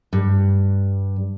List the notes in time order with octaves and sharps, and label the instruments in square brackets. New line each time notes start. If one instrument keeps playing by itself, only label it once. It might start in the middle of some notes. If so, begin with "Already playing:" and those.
[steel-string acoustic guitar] G2